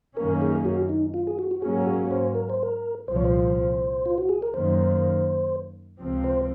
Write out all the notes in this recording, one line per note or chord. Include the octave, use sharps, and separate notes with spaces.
F#2 D#3 A#3 C#4 A#4
G#4
G#4
F#4
D#4
F4
G#4
F#4
F#4
G#2 F#3 A#3 C#4 G#4
G#4
C5
A#4
C5
A#4
C2 A#2 F3 C5
C#5
C5
F4
F#4
G#4
A#4
F#2 D#3 A#3 C5
C#2 C3 F3 C4
C5